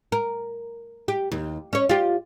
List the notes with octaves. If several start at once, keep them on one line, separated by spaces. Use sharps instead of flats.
A#4
G4
D#2
C#4 C#5
F4 G4